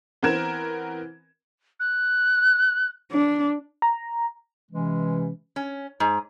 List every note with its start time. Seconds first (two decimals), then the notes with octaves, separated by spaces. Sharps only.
0.23 E3 B3 C4 A#4 G#6 E7
1.80 F#6
3.12 D4
3.82 A#5
4.71 C3 E3 G#3 C#4
5.56 C#4
6.00 G#2